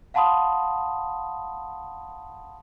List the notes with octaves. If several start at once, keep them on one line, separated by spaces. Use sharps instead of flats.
F5 F#5 A5 B5 C6 D#6